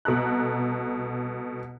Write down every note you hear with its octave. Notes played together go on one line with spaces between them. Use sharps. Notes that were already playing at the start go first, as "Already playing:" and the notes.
C2 B2 A4 A#5 F#6